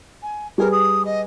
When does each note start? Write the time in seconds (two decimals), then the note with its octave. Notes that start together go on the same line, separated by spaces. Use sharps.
0.23 G#5
0.58 G3 G#4 A#4 B4
0.72 D#6
1.05 D#5